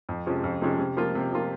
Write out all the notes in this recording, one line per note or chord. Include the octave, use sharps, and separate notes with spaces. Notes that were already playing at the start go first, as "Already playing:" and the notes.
F2
C3 F3 G#3 C#4
F2
C3 F3 G#3 C#4
C3
F3 A#3 F4
C3
F3 A#3 F4